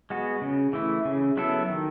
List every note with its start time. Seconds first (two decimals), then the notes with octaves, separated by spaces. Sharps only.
0.10 G#3 B3 F#4
0.41 C#3
0.73 E3 A3 E4
1.05 C#3
1.37 F#3 B3 E4 A4
1.69 D#3